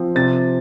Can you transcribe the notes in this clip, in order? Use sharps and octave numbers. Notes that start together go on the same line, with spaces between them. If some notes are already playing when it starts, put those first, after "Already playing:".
Already playing: F3 C4
C3 A6